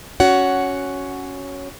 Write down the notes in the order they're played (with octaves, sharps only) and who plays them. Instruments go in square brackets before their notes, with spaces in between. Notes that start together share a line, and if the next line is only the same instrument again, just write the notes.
[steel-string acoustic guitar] C#4 F#4 C#5 F#5